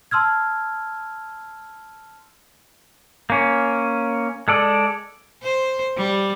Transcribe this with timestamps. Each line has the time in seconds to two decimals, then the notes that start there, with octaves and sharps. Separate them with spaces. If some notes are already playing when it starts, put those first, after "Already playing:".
0.11 A5 C6 E6 F6 G#6
3.30 A#3 C#4
4.48 G#3 A4 D5
5.43 C5
5.97 G3